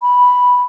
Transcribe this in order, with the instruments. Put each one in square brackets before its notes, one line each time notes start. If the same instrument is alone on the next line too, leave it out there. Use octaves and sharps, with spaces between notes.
[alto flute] B5